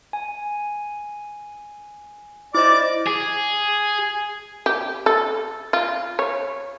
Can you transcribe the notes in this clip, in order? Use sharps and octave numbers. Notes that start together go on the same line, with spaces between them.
G#5
E4 C5 D5 D#5 D6
G#4
G4
A4
F4
C#5